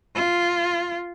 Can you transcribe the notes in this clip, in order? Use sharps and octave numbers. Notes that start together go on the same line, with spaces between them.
F4